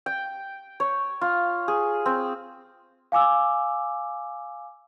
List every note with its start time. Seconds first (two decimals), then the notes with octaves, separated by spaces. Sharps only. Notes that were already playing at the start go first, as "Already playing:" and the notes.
0.06 G5
0.80 C#5
1.21 F4
1.68 G#4
2.06 C4
3.12 F5 G#5 D6 E6